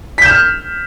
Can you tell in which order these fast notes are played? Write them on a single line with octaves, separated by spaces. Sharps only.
B6 G6 E7 F6